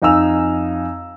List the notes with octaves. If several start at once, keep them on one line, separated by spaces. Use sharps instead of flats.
F2 D#4 F5 G#5 E6 F7